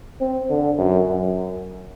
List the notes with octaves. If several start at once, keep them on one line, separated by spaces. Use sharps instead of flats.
C4
D3
F#2
F#2